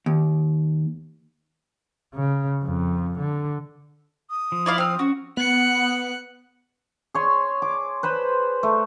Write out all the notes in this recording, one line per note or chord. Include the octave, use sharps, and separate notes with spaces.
D#2
C#3
F2
D3
D#6
F3
E4 D5 F5
C4 F6
C#4 F#4
B3 F#6 C#7
G#4 C#5 C6
D6
B4 C5 B5
A3